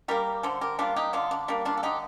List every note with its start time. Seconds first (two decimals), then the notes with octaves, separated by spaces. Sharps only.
0.08 G3 A#3 G4 A#4
0.43 D3 A4 C5
0.61 G4 A#4
0.79 G3 A#3 D4 F4
0.96 D#4 G4
1.13 D3 D4 F4
1.31 D4
1.48 G3 A#3 D4
1.65 D4 F4
1.77 A4
1.83 D3 D#4 G4